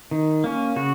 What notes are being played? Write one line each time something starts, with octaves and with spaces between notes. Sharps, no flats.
D#3
A#3 C#4
C#3 F#4